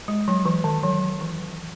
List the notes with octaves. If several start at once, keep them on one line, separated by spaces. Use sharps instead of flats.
G#3
F#3
E3
D#3
F#3
E3